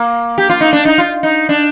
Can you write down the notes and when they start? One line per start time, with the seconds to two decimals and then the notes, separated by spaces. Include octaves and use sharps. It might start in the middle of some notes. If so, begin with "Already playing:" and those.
Already playing: A#3
0.38 G4
0.50 F4
0.61 D#4
0.73 D4
0.85 D#4
0.98 F4
1.23 D#4
1.49 D4